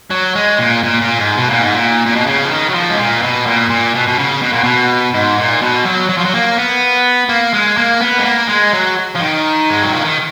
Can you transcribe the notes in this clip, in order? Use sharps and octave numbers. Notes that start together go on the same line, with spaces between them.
F#3
G#3
A#2
A#2
A#2
G#2
B2
A#2
G#2
A#2
A#2
B2
C#3
F3
D#3
F#3
F3
G#2
A#2
B2
A#2
A#2
B2
B2
C#3
B2
A#2
B2
G#2
A#2
B2
F#3
F#3
F3
F#3
A#3
B3
A#3
G#3
A#3
B3
G#3
A#3
G#3
F#3
F3
D#3
G#3
F#3
F3
D#3